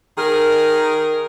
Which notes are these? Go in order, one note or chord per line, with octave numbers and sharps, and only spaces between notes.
D#3 G#4 A#4